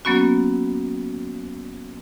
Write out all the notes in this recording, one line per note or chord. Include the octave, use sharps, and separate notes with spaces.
F#3 A#3 B3 C#4 F#4